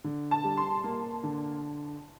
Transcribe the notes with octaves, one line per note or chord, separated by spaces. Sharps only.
D3
A5
G3
C6
A#3
D3